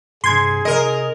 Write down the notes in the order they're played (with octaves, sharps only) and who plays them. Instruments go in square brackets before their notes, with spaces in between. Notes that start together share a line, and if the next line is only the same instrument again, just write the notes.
[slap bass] G2 C3 [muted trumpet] G#4 [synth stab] C6 G#6
[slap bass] C3 [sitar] A#4 D#5